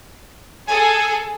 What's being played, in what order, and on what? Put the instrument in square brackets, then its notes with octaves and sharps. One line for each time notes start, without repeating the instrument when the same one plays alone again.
[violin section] G#4 A4 [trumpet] G#5